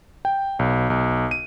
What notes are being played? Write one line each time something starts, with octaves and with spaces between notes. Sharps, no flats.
G5
B1
B1
D#7